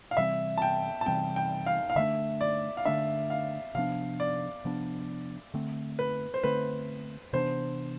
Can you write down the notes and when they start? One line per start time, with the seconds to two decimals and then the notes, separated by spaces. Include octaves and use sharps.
0.11 F5
0.17 C3 E3 G3 C4 E5
0.58 A5
0.62 G5
1.01 A5
1.06 C3 E3 G3 C4 G5
1.36 G5
1.66 F5
1.90 F5
1.96 D3 F3 A3 D4 E5
2.41 D5
2.77 F5
2.85 D3 F3 A3 D4 E5
3.30 F5
3.75 C3 F3 B3 D4 F5
4.20 D5
4.65 C3 F3 B3 D4
5.54 D3 A3 C4
5.99 B4
6.34 C5
6.44 D3 A3 C4 B4
7.33 C3 E3 B3 D4 C5